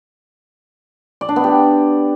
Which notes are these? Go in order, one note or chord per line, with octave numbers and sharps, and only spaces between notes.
D5
D4
B3
G4